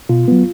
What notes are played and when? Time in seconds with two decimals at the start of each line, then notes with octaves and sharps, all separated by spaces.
0.09 B2 F4
0.28 F#3 B3